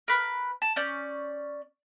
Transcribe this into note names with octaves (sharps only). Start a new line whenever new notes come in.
A#4 B4
A5
C#4 D5 G6